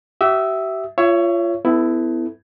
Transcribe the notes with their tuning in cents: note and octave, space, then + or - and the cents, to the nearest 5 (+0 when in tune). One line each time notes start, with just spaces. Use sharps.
G4 -45 E5 +0 D#6 +25
F4 -20 C#5 +10 E5 +30
B3 +30 E4 +0 A4 +0